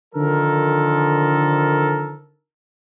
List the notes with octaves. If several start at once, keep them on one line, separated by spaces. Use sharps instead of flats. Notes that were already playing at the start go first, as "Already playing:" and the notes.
D3 D#3 F3 A4 A#4